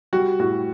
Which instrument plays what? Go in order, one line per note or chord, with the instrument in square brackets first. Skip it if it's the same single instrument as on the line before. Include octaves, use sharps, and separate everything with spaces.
[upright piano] G3 F#4
A2 F#4